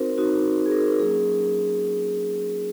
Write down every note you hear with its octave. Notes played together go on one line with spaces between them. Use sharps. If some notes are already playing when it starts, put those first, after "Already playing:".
Already playing: C4 D#4 F#4 A#4 C5
C4 D#4 F#4
G#4
A#4
F#3 A#3 C#4 G#4